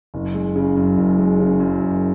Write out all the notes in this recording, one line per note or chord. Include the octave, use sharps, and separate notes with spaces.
F#1
G#3
C#3
F#2
F#1
G#3
C#3
F#2
F#1